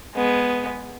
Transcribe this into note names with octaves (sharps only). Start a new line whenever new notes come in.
G#3 B3